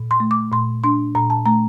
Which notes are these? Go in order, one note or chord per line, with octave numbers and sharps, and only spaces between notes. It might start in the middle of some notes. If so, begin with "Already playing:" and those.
Already playing: A#2
C6
A3
D6
A#2 C6
D4 C6
A#2 A#5
A5
A3 A#5